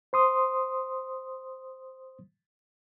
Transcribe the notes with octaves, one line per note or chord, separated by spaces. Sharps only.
C5 C6 D#6